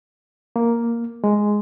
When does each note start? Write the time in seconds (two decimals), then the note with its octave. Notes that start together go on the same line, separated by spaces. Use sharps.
0.56 A#3
1.24 G#3